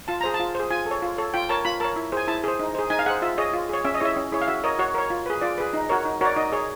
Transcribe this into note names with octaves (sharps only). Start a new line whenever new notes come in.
F4 A5
G#4 C5 A#5
A5
F4
G#4 C5
F4 G#5
A4
C#5
F4
A4 C#5
F4 G5
A#4 C#5 A5
F4 B5
A#4 C#5 A5
E4
G#4 C5 G#5
E4 A5
G#4 C5
D#4
G#4 C5
D#4 G#5
F5
G#4 C5 F#5
F4 E5
G#4 C#5 D#5
F4
G#4 C#5
C#4 E5
D#5
E4 G#4 C#5 E5
C#4
E4 G#4 C#5
F5
F#4 E5
A#4 C#5 D#5
F#4 C#5
A#4 C#5
F4
G#4 B4
F4 D5
G#4 B4
D#4
F#4 A#4 C#5
D#4
F#4 A#4 C#5 D5
D#4 D#5
G#4 C#5